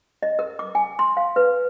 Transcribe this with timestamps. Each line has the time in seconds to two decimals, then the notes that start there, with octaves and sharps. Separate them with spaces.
0.23 D#5
0.39 A#4
0.59 D6
0.75 G#5
0.99 C6
1.17 F5
1.36 B4